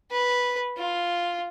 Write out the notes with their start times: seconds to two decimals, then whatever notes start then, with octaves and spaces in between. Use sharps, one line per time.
0.11 B4
0.77 F4